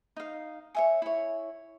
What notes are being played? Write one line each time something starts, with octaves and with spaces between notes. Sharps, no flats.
D#4 F5
C#5 E5 G#5
E4 C#5